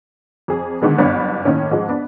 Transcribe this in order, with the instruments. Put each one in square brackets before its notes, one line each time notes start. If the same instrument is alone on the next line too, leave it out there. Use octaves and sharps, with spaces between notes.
[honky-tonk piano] F2 G#4
D3 D#3 G#3 B3
F#1 G2 B3 D4 C#5
A2 D#3 A#3 C#4
G#2 F3 G#3
B3 D4